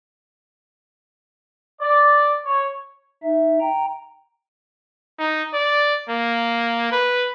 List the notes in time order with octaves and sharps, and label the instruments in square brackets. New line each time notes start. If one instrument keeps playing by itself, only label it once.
[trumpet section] D5
C#5
[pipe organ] D#4 E5
G5 A#5
[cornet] D#4
D5
A#3
B4